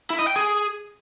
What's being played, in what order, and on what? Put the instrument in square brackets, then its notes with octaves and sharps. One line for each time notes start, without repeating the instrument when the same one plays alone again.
[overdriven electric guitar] E4
D#5
G5
G#4